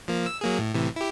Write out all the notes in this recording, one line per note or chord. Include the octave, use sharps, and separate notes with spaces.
F3 A#3
E6
F#3 A#3 G#4
A2
A2 C3 E3
E4 G4